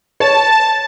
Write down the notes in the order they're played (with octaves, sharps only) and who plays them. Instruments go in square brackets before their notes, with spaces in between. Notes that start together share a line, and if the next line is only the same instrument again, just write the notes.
[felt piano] C#5 [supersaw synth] A5